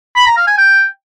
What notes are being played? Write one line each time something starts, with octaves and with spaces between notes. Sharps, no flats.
B5
A#5
F5
G#5
G5